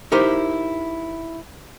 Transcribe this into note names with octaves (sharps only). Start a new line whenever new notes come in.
D#4 E4 G4 A#4 C5